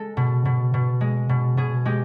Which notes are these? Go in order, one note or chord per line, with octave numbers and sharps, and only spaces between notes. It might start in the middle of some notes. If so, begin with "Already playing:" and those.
Already playing: G#3 A4
B2
B2
B2
G#3
B2
B2 G#4
G#3 G4